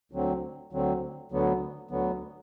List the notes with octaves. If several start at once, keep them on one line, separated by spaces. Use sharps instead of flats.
D2 D3 F#3 C4
D2 D3 F#3 C4
D2 D3 F#3 B3
D2 D3 F#3 B3